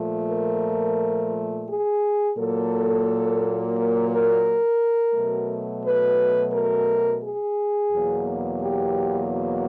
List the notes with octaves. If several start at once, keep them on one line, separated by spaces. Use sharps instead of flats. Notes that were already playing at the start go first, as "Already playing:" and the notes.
Already playing: A#2 F3 A3
A#4
G#4
A#2 F#3 A#3 A4
A#4
A#4
B2 F#3 A3
B4
A#4
G#4
E2 B2 F#3 A#3
G4
F#4